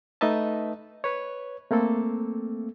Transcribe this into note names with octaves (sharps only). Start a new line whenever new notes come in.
A3 D#4 B4 D#5 E5 A5
B4 C#5
A3 A#3 C4 A4